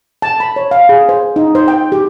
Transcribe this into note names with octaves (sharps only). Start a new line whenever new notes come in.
A5
B5
C#5
F5
G#4
C5
D#4
C5
G5
G4